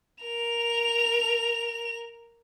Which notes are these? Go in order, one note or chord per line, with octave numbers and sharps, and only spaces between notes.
A#4 F7